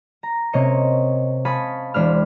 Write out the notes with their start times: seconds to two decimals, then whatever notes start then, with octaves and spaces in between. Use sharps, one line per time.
0.23 A#5
0.53 C3 A#3 C#4 C#5 D#5 C#6
1.45 F5 G#5 A5 B5 C#6 D#6
1.94 E1 D4 C5 B5 F6